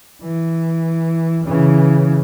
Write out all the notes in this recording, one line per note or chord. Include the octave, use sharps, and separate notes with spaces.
E3
C#3 E3